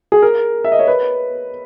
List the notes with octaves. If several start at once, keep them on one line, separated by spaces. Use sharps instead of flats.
G#4
A#4
E5
D#5
C#5
B4